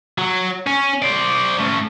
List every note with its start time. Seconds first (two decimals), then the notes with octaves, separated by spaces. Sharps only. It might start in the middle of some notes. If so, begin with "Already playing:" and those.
0.18 F#3
0.67 C#4
1.02 C5 D5
1.59 A3 C#4